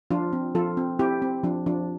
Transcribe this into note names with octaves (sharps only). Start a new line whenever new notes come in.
F3 D4 F4
C4
F3 F4 A4
C4
C4 E4 G4
C4
F3 D4
F3 D4